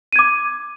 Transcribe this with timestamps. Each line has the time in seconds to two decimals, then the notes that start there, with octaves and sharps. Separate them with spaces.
0.13 D#7
0.16 G#6
0.19 D6